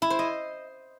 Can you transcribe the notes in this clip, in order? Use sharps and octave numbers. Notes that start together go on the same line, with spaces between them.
E4
C5
D#5